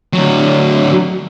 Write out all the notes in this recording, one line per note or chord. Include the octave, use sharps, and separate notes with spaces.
D2 F#3